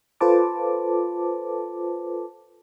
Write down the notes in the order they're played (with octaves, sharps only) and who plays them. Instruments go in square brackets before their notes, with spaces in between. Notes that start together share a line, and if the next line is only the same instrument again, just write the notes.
[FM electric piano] F4 A4 B4 C5 A5 D6